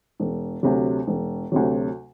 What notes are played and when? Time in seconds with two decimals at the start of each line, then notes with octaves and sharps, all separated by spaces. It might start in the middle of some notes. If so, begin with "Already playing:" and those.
0.20 E1
0.63 D2 C3 F#3
1.07 E1
1.52 D2 C3 F#3